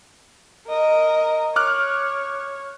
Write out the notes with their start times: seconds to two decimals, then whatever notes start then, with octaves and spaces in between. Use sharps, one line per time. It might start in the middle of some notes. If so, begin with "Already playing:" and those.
0.68 A#4 D#5
1.56 C#5 D6 F6 F#6